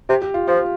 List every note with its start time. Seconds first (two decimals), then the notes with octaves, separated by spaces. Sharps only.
0.09 C3 G4
0.22 G4
0.34 F4
0.47 F3 F4